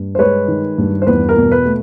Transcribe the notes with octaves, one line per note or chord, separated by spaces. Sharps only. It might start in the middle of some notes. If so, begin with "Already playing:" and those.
Already playing: G2
C5
G#3 B4 C#5
D#3
G2
C5
E2 B4
A#4
B2
B4
A3